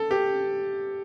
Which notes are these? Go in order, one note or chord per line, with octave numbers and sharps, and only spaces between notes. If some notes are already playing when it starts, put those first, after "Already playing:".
Already playing: A4
G4